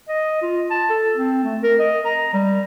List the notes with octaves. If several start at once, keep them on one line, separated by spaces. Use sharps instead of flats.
D#5
F4
A5
A4
C4
A3
A#4
D#5
A#5
G3